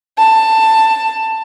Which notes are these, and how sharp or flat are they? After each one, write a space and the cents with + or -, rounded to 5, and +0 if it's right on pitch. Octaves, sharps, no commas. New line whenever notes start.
A5 +15